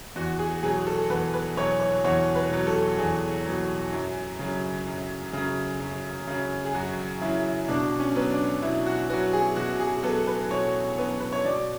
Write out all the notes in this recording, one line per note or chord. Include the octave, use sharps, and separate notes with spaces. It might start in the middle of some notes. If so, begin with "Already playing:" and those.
E2 F#4
G#4
B2 F#3 G#4
A4
E2 B4
B4
B2 F#3 C#5
C#5
E2 C#5
B4
B2 F#3
A4
E2 G#4
B2 F#3
F#2
C#3 F#3
F#2
C#3 F#3
F#2
C#3 F#3
G#4
F#2 F#4
C#3 F#3 E4
B2 D4
C#4
F#3 B3
D4
B2 E4
F#4
F#3 B3 F#4
G#4
B2 F#4
G#4
F#3 B3 A4
B4
B2 C#5
F#3 B3
B4
C#5
B2 D5